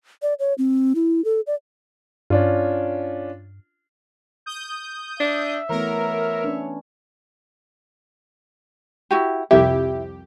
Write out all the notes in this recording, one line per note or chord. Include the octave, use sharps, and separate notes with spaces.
D5
C#5
C4
E4
A4
D5
G2 C#4 D4 F4
D#6 G6
D4 E5
E3 A3 B3 A#4 C#5
C#4 D4
E4 F#4 G4
C2 F2 E4 G4 E5